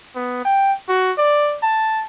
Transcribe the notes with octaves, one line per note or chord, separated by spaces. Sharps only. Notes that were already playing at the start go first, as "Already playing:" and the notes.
B3
G5
F#4
D5
A5